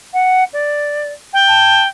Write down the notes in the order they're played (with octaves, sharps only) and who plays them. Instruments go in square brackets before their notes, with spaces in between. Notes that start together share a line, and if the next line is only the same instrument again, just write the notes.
[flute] F#5
D5
[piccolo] G5
[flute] A5